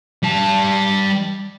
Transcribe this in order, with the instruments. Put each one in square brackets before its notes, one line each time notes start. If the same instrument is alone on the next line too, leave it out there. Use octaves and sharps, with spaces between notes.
[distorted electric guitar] G3 A5